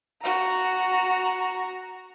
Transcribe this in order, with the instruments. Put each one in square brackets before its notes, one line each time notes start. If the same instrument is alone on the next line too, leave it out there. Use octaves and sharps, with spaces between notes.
[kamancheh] F#4 A#5